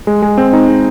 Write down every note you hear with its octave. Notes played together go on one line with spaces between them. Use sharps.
G#3
G#3
C4
D#4
G#3